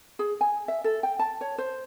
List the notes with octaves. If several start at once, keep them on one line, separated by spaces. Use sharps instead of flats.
G#4
G#5
E5
A4
G5
A5
C#5
C5